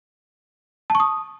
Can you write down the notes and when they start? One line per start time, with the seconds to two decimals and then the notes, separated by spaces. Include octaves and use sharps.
0.90 A5
0.95 C#6
1.00 D#6